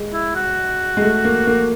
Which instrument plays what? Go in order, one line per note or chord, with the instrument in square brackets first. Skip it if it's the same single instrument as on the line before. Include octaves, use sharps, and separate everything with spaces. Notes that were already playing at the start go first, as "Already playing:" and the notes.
Already playing: [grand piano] G#3
[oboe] E4
F#4
[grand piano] G#3
A3
A#3
A#3